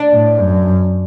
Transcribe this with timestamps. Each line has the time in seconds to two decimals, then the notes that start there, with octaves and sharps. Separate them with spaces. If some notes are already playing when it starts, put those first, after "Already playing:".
Already playing: D4
0.12 A2
0.40 F#2